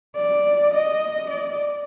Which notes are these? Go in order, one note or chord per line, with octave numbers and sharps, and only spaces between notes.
D5
D#5
D5